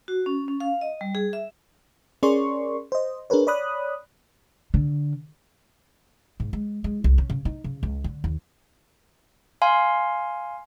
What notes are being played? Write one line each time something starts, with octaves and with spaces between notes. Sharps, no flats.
F#4
C#4
C#4
F5
D#5
G3
G#4
E5
C#4 G#4 A#4 D5 C6 C#6
C5 D#5
D4 G#4 A#4 B4 C#5
C#5 D5 B5 D#6 F#6
D3
G#2
G#3
G#3
C2
C#4
C#3
D#4
C#3
C#2
D3
D#2
F5 G#5 C6